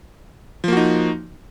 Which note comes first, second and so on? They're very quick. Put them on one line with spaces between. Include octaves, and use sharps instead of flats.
F3 A#3 F#4 D#4